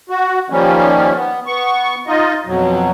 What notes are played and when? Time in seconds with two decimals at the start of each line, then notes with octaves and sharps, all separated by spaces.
0.10 F#4
0.50 D#3 F3 G3 A#3 C#4
1.15 B3
1.46 B3 C#6
2.07 D#4 F4 D#5
2.46 F2 B2 F#3